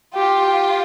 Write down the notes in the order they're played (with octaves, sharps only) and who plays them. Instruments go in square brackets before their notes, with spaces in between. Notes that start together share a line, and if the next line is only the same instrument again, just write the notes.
[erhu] F4 [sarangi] G4
[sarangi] G4